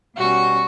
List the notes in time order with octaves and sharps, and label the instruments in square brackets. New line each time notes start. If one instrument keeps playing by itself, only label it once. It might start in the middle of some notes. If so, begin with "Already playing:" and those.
[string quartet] B2 G3 C#4 F#4